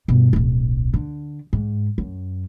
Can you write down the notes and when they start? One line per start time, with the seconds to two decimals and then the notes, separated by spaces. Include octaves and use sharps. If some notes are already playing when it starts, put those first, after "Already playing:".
0.08 G2 B2
0.33 D1 B1
0.94 D3
1.53 G#2
1.98 F#2